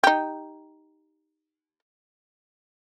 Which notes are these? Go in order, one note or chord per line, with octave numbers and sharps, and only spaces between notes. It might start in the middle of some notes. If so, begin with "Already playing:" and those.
D#4 G4